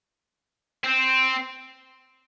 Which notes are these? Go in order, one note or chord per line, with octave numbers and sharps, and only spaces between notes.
C4